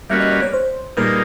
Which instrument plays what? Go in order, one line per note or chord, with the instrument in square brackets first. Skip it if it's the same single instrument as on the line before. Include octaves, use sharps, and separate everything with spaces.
[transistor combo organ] G3 A#3 C#4 F#4 B4 [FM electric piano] E5
[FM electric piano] D#5
D5
C#5
C5
[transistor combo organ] A#2 G3 A#3 D#4 G#4 [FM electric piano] B4